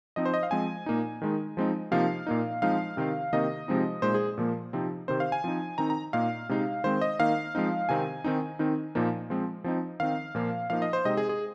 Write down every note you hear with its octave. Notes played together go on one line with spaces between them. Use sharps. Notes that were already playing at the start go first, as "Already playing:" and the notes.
F3 C4 D#4 D#5
C5
D#5
F5
F3 G#3 C4 G#5
A#2 A#3 D#4
D#3 G#3 D#4
F3 G#3 C4 D#4
C3 F3 A#3 D#4 F5
A#2 A#3 D#4
F3 G#3 C4 D#4 F5
C3 D#3 C4 D#4
C3 D#3 A#3 D#4 D#5
C3 F3 G#3 C4 D#4
A#2 G#3 D#4 C5
G#4
A#2 F3 A#3
C3 F3 C4 D#4
C3 D#3 C4 C5
F5
G#5
F3 C4 D#4
D#3 C4 D#4 A#5
A#5
A#2 A#3 D#4 F5
C3 G#3 D#4
D#3 G#3 C4 C5
D#5
D#3 A#3 D#4 F5
F3 G#3 C4 D#4
C3 D#3 C4 D#4 G#5
D#3 C4 D#4
D#3 C4 D#4
A#2 F3 A#3 D#4
F3 G#3 C4
F3 C4 D#4
D#3 C4 D#4 F5
A#2 F3 A#3
F3 A#3 D#4 F5
D#5
C5
C3 G#3 C4 D#4 D#5
G#4
G#4